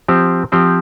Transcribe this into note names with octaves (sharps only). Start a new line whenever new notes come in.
F3 C4 G4 C5
F3 C4 G4 C5